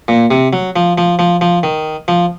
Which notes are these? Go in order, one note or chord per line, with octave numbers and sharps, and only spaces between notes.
A#2
C3
F#3
F3
F3
F3
F3
D#3
F3